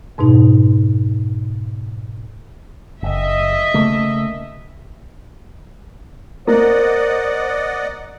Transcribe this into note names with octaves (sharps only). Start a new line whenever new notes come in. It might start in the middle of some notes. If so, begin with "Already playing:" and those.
F2 G#2 B2 D#4
F#1 D#5 E5
C#3 A3 A#3
A#3 C5 D5 D#5 F#5